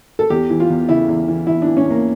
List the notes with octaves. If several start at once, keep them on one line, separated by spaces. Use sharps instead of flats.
A4
E2 G4
E3
F4
E2
C#3 E4
E2
E3
E2 E4
E3 D4
C#4
E2 A#3